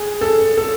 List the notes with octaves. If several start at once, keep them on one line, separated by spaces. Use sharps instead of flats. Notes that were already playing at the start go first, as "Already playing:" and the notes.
Already playing: G#4
A4
A4